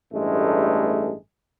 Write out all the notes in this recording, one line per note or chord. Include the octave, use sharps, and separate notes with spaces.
A1 G2 G#3 A3